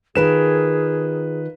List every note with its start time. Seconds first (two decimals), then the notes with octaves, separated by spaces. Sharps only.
0.15 D#3 F4 G#4 A#4 B4 E7